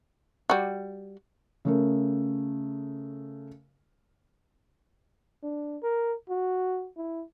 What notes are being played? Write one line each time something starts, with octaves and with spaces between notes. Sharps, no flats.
G3 F#4
C#3 A3 A#4
D4
A#4
F#4
E4